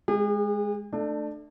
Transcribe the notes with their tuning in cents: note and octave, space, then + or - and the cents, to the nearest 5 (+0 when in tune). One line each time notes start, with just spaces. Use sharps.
G#3 +0 G#4 -45
A3 +0 D4 +25